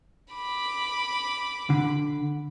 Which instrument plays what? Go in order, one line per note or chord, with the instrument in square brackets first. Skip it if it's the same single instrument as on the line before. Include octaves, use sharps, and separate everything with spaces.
[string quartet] B5 D6
[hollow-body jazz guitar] D3